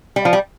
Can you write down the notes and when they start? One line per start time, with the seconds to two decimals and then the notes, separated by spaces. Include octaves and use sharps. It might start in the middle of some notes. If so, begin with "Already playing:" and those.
0.16 G3
0.25 F3
0.33 G3